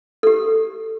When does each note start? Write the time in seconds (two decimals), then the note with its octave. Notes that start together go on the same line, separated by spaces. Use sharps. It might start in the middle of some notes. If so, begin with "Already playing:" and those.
0.23 G4 A4